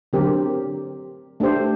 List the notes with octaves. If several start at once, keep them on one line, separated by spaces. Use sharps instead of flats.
D3 F#3 C4 G4 A#4
A3 D4 G4 C5